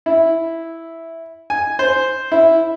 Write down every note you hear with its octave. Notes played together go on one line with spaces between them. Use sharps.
E4
G#5
C5
E4